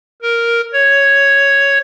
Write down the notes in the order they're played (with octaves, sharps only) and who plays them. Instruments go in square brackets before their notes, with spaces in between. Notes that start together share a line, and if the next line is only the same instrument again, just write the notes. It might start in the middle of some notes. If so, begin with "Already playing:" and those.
[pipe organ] A#4
C#5